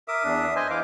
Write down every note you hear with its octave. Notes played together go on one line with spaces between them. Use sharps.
A#4 E5 D6 D#6
E2 D4
C5 D#5 G#5
E3 F5 D6